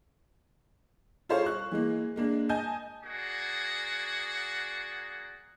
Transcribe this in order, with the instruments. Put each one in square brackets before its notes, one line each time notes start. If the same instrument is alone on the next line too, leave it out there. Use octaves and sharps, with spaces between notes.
[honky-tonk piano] F4 G#4 A4 C5 C#5 F5
C#6 F#6
E3 G#3 A#3
G#3 A#3 D4
D#5 G#5 A5 G6
[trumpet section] A#3 D4 F#4 G#4 F#5